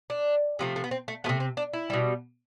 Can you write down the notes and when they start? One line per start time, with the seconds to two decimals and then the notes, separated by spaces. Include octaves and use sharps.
0.10 D4
0.59 C3 F3 A3
0.76 A3
0.84 B3
0.91 C4
1.08 A3
1.24 F3 A3 B3
1.29 C3
1.40 C4
1.57 D4
1.73 E4
1.90 B2 G3